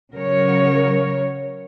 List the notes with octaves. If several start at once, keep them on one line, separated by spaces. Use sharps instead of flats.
C#3 F#3 A#4 C#5